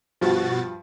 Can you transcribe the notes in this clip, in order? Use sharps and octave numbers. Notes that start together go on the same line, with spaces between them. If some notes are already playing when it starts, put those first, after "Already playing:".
G2 B2 F3 F#4 A6